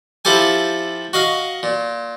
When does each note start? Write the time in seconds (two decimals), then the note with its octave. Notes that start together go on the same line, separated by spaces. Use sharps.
0.25 F3 E4 G4 A4 G#5
1.13 F#4 D#5 F5
1.63 A#2